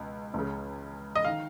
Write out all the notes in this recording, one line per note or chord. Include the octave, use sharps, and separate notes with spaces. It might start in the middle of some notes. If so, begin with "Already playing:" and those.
Already playing: C#2 B2
C#2 C#3
D#5
D#3 F5